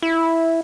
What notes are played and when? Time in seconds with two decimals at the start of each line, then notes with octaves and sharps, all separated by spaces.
0.03 E4